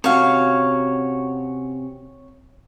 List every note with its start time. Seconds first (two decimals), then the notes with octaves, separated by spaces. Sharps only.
0.04 C3 C#4 F#4 C#5 F5